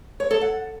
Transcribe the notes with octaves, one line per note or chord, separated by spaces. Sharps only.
C#5
A4
F#5